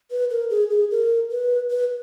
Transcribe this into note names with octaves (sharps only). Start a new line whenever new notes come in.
B4
A#4
G#4
G#4
A#4
B4
B4